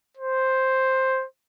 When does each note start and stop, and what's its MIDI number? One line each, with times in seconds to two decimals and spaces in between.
0.17 1.25 72